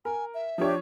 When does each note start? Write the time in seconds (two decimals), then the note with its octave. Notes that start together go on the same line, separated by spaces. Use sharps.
0.05 A#4 G#5
0.34 E5
0.58 F3 D4 G4 C#5